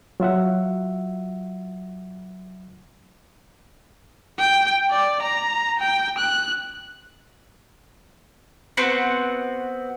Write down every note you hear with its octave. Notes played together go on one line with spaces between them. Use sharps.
F#3 F4 E5 F#5
G5
D5
A#5
G5
F#6
B3 C4 F#4